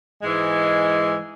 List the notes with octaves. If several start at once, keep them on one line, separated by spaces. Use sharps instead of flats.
G#2 E3 G#3